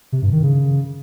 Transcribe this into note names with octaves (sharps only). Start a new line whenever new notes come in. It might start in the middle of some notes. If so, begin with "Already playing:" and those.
C3
G2
D#3
C#3